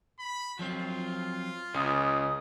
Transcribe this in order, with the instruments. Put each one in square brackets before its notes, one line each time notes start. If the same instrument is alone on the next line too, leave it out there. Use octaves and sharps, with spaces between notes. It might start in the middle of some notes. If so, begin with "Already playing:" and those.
[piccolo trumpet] B5
[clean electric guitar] F3 F#3 C4 [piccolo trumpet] F4
[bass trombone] C#2 [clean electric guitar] C#3 [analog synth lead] D#6